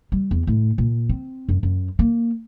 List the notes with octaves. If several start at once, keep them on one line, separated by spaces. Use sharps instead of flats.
G3
E2
A2
A#2
C4
F#2
F#2
A#3